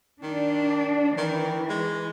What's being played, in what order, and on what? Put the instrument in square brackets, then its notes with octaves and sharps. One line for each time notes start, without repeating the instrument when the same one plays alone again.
[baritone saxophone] D#3 [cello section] D4
[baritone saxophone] D#3 [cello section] E3
[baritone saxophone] G#3